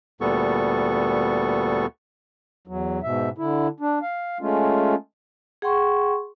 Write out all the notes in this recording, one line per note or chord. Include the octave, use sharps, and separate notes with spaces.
D2 A#2 G3 B3 A4 C#6
E2 F#3
G#2 B2 E5
D3 E4
D4
F5
G#3 A3 C#4 F4
G#4 F#5 G5 C6 C#6